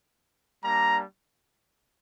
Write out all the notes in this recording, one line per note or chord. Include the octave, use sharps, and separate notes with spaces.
G3 A#3 D4 A#5